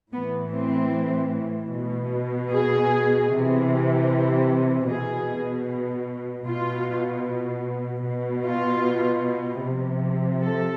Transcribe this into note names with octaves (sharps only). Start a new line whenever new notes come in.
A2 E3 B3
C4
B2
G#4
C3 E3
B2 G#4
B2 F4
B2
F4
C3 F3
A4